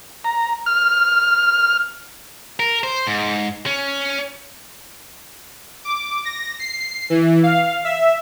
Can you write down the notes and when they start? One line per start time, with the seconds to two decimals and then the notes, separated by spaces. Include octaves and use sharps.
0.24 A#5
0.66 F6
2.60 A#4
2.83 C5
3.07 G#2
3.66 C#4
5.85 D6
6.25 A#6
6.60 C7
7.10 E3
7.43 F5
7.84 E5